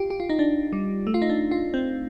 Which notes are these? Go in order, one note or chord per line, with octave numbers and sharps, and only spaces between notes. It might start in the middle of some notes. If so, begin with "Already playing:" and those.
Already playing: F4 G4
G4
F4
D#4
D4
G3
A3
F4
D#4
D4
F4
C4